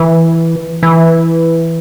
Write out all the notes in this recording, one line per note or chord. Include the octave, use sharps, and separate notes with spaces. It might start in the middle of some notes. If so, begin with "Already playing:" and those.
Already playing: E3
E3